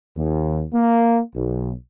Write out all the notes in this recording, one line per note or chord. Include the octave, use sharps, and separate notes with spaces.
D#2
A#3
B1